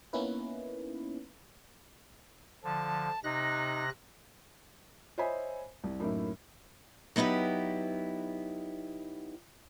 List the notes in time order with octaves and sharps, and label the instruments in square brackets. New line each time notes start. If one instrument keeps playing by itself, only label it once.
[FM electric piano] A#3 B3 C#4 D#4 E4 B4
[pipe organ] D3 F3 [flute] A5
[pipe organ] C3 F#6 A#6 [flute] D#4
[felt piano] C5 C#5 D#5 E5 G#5 B5
C2
F#2 A2 A#3 D#4 E4
[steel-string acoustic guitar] F#3 B3 D#4 E4 G4